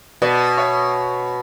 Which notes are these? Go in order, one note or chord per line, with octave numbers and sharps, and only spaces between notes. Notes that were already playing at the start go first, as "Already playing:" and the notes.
B2 B4 D5
C#5 E5